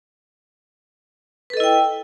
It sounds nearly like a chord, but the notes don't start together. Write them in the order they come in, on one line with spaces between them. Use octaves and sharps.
B4 A4 D#5 E4 G5